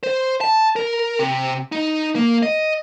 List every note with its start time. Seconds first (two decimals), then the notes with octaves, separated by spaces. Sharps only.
0.03 C5
0.41 A5
0.76 A#4
1.19 C3
1.72 D#4
2.15 A#3
2.43 D#5